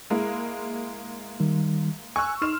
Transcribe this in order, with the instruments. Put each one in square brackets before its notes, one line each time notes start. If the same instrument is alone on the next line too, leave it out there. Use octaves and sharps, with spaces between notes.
[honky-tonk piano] G#3 A#3 E4
[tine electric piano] D#3 G3
[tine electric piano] G#5 F#6 [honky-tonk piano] C#6 E6
[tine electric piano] D#4 [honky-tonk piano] C6 F6 E7